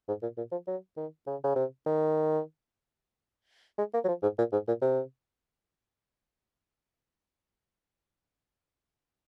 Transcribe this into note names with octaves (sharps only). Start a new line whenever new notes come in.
G#2
A#2
A#2
F3
F#3
D#3
C#3
C#3
C3
D#3
G#3
A#3
F#3
F3
G#2
A#2
G#2
A#2
C3